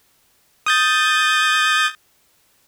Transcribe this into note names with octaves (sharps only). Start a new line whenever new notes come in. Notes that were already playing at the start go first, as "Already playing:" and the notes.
D#6 G6 A6